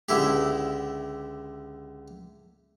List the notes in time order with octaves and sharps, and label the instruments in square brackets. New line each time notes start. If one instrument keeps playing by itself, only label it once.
[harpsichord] C#2 D3 E4 G4